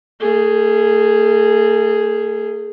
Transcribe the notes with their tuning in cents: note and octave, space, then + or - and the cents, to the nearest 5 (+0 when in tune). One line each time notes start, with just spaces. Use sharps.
A3 +45 G#4 +0